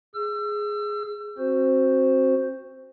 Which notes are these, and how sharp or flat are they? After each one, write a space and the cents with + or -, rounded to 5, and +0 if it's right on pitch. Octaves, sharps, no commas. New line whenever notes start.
G#4 +0 E6 +35
C4 +30 F#4 +0 C5 +0